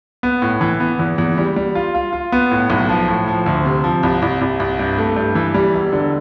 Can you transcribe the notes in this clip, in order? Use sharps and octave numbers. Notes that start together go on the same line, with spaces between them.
B3
A2
E3
B3
E2
E2
G3
G3
F4
F4
F4
B3
A2
B1
F3
A2
F3
D2
C3
F3
C2
C2
C2
C2
G2
A3
G2
E3
G3
E1
D3